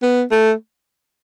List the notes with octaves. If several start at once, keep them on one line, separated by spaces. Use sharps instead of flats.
B3
A3